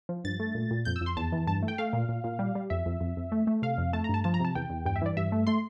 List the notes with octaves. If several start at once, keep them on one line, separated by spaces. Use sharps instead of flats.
F3
G2 A6
A3
A#2
A#2
F2 G6
E6
F2
C6
E2 A5
E3
G2 A5
A3
G5
A3 F5
A#2
A#2
A#2
G3
G3
F2 E5
F2
F2
F2
A3
A3
C3 F5
F2
A3 A5
A#5
G2 A5
F3 A5
A#5
C3 A5
E2 G5
E2
G2 G5
E5
E3 D5
G2 E5
A3
A3 C6